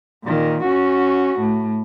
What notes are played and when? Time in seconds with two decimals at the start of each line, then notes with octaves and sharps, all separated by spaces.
0.24 A#2 D#3
0.63 C#4 F#4
1.40 A2